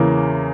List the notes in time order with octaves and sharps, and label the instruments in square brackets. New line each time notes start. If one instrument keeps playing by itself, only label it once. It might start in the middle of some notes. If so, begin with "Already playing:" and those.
Already playing: [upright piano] E2 C#3 E3 A#3